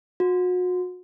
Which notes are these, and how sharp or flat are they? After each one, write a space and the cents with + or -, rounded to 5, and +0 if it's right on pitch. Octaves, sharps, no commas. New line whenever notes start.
F#4 -35